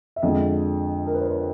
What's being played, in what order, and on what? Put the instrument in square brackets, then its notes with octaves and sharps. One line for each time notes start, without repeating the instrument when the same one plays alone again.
[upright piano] E5
F2 D3 F3 G#3 D#5
A#4
B4
C5
C#5